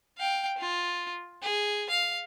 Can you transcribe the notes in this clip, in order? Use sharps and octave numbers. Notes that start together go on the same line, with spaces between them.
F5 G5
F4
G#4
F5